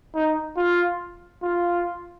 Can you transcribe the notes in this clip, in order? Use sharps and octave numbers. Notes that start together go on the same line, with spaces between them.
D#4
F4
F4